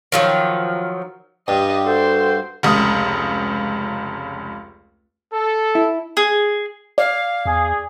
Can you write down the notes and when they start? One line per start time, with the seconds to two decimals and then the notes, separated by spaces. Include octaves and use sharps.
0.12 D#3 F3 F#3
1.48 G2 G4 D#5
1.86 F#4 A4 C5 G5
2.63 F1 C#2 D#6
5.33 A4
5.75 E4
6.17 G#4
6.98 D5 F5
7.46 E2 G#4